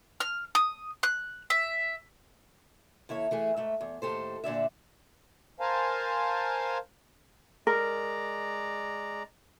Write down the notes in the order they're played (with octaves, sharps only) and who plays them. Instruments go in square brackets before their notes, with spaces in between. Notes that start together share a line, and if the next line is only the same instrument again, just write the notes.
[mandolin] F6
D#6
F#6
E5
[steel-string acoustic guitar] D#2 E4 A4 C#5
E3 A3 G#4
G#2 A3 E5
E2
D#2 A2 G4 A4 C5
A#2 D3 D5 E5
[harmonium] A#4 C5 F5 G#5 A5
[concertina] G#3 D5 A#5 [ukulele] A#4